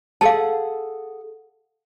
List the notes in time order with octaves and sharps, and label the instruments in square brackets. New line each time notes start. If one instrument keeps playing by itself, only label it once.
[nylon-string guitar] G#4 A4 F#5 [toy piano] F5 A5